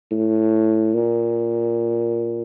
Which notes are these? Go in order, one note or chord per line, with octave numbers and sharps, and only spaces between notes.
A2
A#2